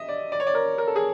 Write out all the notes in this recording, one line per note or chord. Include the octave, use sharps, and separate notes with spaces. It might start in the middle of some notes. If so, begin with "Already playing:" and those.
Already playing: D#5 E5
D5
D5
C#5
D5
A#4
A#4
A4
G#4